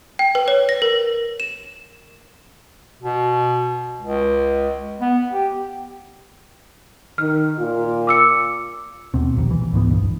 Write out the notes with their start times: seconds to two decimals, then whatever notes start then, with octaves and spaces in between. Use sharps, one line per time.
0.19 G5
0.35 B4
0.48 C#5
0.69 A#6
0.82 A#4
1.40 E7
3.03 B2
4.01 C#2
5.01 B3
5.32 G4
7.18 D#3 F6
7.58 A#2 F4
8.07 D6 E6 C#7
9.14 D#2 B2 C4
9.34 E1 A#1 D#2
9.51 E3
9.72 C#2 G#2 E3 B3
9.90 A#1 G2